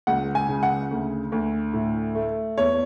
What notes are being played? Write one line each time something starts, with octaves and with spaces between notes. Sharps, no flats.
C#2 F#5
G#5
C#3
F#5
D2
D2
A2
A3
E2 C#5